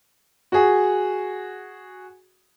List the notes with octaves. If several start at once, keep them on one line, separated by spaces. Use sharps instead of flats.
F#4 G#4